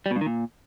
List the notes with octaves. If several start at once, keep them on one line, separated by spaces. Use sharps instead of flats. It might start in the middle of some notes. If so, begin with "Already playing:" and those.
G3
B2
G2
D#3
A#2